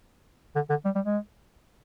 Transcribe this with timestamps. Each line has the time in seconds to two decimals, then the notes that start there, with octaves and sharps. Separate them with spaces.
0.55 D3
0.70 D3
0.85 G3
0.95 G3
1.05 G#3